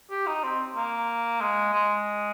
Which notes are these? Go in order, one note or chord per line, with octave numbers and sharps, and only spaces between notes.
G4
D#4
C4
A#3
G#3
G#3